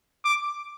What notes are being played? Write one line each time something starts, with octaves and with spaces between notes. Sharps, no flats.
D6